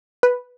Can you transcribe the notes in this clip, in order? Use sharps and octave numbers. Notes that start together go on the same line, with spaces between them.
B4